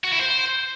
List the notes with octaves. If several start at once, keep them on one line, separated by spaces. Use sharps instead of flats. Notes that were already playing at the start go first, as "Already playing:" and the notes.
F#4
E4
C5